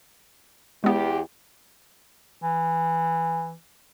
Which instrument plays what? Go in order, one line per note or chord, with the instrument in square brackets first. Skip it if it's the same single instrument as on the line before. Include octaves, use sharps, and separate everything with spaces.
[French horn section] E2 G4 [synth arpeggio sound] G#3 B3
[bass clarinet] E3